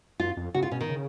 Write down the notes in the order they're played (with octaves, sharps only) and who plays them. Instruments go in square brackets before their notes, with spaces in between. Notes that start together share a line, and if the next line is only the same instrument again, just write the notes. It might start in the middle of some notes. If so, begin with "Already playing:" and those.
[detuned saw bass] F#2 [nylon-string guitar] F4
[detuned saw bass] F2
[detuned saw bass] C#3 [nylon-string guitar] F#4
[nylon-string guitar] F4
[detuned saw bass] B2 [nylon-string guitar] C#4
[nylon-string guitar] D#3
[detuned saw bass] C#3